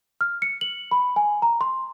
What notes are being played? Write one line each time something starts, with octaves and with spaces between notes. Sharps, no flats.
F6
C#7
F#7
B5
G#5
A#5
C6